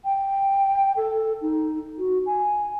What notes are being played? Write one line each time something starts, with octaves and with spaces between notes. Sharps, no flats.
G5
A4
D#4
F#4
G#5